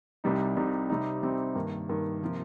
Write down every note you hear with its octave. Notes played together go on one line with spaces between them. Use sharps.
C2 C3 G3 D#4
C2 C3 G3 D#4
C3 G3 C4 D#4
C3 G3 C4 D#4
G2 D#3 A#3
G2 D#3 A#3
C3 F3 A#3 F4